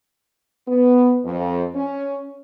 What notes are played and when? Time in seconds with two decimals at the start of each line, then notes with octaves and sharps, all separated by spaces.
0.67 B3
1.25 F2
1.75 C#4